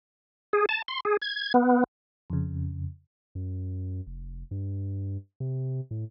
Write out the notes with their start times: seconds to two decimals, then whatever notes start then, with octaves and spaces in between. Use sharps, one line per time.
0.53 G#4
0.69 A5
0.88 C6
1.05 G#4
1.22 G#6
1.54 B3
2.30 F2 C#3
3.35 F#2
4.07 F1
4.51 G2
5.40 C3
5.91 A2